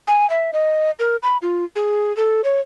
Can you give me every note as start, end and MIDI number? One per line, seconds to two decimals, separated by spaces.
0.07 0.28 80
0.30 0.51 76
0.53 0.91 75
0.99 1.16 70
1.23 1.37 83
1.42 1.64 65
1.75 2.15 68
2.17 2.41 69
2.44 2.60 73